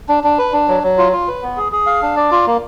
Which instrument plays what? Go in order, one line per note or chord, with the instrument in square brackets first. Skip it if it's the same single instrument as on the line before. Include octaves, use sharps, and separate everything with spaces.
[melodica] D4
D4
B4
D4
F#3
F#3
F4
F4
B4
B3
G#4
G#4
F5
D4
D5
F4
A#3